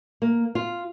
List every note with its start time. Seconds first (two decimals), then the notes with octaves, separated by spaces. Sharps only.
0.22 A#3
0.55 F4